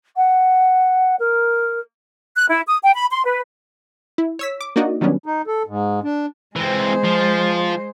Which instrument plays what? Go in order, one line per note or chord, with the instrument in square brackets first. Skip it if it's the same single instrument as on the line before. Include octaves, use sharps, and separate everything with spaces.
[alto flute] F#5
A#4
[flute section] F#6
E4
D#6
G5
B5
C6
B4
[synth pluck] E4
C#5 E6 B6
D6
A#3 D4 D#4 F#4 D5 D#5
D#3 F#3 G3 B3 C#4 D4
[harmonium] D#4
A4
G#2
D4
[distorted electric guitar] E3 C4 [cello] G#3 C5
[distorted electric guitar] F3